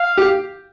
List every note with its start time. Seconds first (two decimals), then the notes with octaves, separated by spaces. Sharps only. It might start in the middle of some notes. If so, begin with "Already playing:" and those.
Already playing: F5
0.17 G4